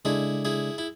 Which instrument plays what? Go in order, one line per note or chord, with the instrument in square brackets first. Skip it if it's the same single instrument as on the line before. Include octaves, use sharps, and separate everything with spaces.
[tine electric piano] C#3 G#3 D4 A4 D5 [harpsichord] E4 G#4
[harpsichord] E4 G#4
E4